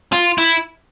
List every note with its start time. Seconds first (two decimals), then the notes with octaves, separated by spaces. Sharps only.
0.13 F4
0.38 E4